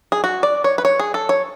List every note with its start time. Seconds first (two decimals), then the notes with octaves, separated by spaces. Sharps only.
0.12 G#4
0.24 F#4
0.43 D5
0.64 C#5
0.78 B4
0.85 C#5
0.99 G#4
1.14 A4
1.29 C#5